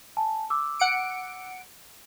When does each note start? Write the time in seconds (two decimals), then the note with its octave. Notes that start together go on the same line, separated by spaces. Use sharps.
0.17 G#5 A5
0.50 D6 E6
0.79 F#5 C#7 D7